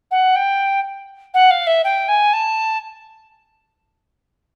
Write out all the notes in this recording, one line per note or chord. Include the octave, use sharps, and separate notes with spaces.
F#5
G5
F#5
F5
E5
G5
G#5
A5